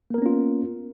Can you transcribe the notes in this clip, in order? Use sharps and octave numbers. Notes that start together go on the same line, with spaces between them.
A#3 B3 C#4 F4 A#4